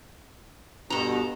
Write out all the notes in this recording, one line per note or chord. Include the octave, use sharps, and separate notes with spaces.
G2 B2 A4 A#5